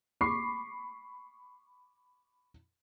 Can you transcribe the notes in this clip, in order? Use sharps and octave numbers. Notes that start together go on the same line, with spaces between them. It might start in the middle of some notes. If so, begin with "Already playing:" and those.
B5 C#6 D6 C7